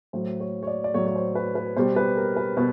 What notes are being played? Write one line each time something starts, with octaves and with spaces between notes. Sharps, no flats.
A2 F#3 C5
C#5
C#5
D5
D5
A2 F#3 C#5
C#5
C5
B4
B4
B2 G3 C5
B4
A#4
B4
B2 B4